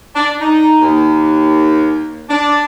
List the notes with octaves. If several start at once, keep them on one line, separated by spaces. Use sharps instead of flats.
D4
D#4
D#2
D4